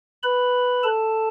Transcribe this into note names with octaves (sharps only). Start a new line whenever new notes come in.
B4 B5
A4 A5